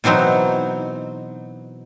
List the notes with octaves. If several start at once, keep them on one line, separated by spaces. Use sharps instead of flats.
B2 E3 F#3 C4 D#4